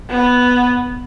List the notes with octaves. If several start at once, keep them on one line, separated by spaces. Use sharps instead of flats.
B3